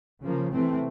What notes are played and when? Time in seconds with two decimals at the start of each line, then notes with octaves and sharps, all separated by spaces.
0.22 C#3 F3 A#3
0.51 C3 E3 A3 C4